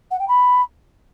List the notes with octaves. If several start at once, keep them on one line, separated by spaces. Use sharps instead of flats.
F#5
G5
B5